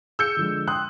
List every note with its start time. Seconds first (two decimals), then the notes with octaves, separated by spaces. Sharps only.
0.19 G#4 E6 G6 C#7
0.37 D3 F3 G#3
0.67 G5 C6 D#6 F#6